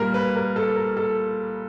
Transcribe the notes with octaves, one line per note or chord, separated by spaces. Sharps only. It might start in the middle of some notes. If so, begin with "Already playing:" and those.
Already playing: A#2 G3 A#3 A#4
B4
A#4
A4
A#4
A4